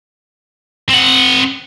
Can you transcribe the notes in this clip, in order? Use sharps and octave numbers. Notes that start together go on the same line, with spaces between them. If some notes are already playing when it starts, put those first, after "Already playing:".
C4 F#5